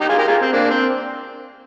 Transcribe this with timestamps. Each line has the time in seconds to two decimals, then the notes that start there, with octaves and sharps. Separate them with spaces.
0.01 D#4 G4
0.09 F4 G#4
0.18 G4 A#4
0.28 F4 G#4
0.42 C4
0.53 A#3 D4
0.70 C4